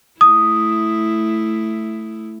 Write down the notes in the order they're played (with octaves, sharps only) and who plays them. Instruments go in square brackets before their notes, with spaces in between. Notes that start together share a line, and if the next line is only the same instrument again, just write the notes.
[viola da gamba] A3 E4 [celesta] D#6